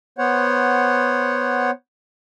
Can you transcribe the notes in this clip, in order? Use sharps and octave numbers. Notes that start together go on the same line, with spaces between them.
B3 C5 C#5 F#5